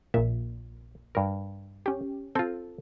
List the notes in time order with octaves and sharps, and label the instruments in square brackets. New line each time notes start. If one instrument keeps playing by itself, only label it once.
[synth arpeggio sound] A#1 A#2 [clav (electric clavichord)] E5
[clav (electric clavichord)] G2 A#4
[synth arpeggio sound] C#4 G4
[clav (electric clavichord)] C4 F4 [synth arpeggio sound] A4